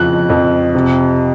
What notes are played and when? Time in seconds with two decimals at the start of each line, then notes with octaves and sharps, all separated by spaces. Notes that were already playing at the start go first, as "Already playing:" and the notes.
Already playing: F2 C#3 F3 F#6
0.30 F2
0.75 C3